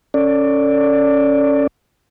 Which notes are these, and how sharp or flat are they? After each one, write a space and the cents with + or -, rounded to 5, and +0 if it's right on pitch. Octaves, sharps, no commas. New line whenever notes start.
C#4 +0 A4 +30 D5 +0